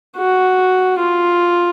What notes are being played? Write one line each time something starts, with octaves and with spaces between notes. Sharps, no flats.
F#4
F4